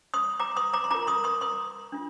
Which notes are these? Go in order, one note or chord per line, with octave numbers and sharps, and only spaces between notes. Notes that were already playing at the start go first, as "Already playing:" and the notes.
C6 D#6
A#5 D6
C6 D#6
A#5 D6
C6
F4 A#4 A#5 D6
C6 D#6
C6 D#6
C6 D#6
D4 F4